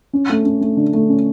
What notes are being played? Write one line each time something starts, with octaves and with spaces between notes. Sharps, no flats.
C#4
A3
C#4
A3
D3
A3
C#4